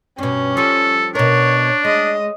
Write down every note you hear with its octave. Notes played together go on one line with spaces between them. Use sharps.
G2 B2 C#4
F3 G3 A4
B2 D4 A#4 C#5
G#3 D#5